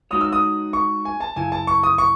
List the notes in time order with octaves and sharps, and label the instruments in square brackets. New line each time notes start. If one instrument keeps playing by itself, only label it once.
[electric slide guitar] G#3 D#4 F#4 C#5 [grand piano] D#6
[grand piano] E6
D#6
C#6
G#5
A5
[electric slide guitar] F#2 C#3 E4 [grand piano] G#5
[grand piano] A5
C#6
D#6
C#6